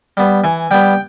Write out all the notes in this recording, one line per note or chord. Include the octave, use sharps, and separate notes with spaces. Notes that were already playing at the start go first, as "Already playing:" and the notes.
G3 B3
E3 G#5
G3 B3 G5